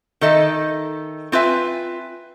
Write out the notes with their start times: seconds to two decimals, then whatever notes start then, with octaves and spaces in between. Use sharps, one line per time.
0.21 D#3 A4 D#5 E5
1.32 C4 F4 B4 E5 G#5